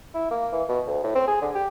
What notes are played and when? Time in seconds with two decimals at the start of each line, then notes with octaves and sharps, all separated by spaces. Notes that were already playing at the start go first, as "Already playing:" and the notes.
0.14 E4
0.30 A#3
0.52 E3
0.69 B2
0.87 D2
1.04 A2
1.15 C4
1.28 G#4
1.42 D3
1.55 G4